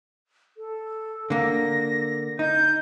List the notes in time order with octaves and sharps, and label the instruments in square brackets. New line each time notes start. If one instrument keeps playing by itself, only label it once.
[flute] A4
[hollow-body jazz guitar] D3 A#3 [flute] A#6
[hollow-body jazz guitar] D#4 [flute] G6